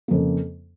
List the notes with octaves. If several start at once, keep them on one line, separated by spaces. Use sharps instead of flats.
F2 C#3 A#3